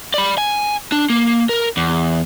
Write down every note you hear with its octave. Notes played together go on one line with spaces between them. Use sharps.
D5 B5
G#5
D4
A#3
A#4
E2